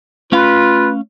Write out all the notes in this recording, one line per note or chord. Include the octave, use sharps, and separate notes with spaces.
A3 C#4 F4 B4 F5